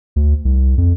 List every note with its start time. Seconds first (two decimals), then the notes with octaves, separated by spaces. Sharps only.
0.16 D2
0.45 C2
0.78 F2